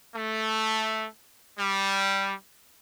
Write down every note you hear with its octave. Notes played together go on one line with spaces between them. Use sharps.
A3
G3